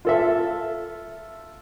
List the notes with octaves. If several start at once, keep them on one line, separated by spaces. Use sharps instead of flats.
F4 A4 E5